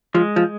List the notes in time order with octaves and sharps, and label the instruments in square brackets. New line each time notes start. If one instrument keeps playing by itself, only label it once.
[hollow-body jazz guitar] F3 [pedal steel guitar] G#3
[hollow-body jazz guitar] F3